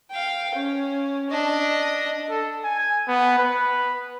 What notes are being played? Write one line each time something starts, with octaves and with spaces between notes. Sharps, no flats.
F5 G5
C#4
D4 D#5
A4
G#5
B3
B4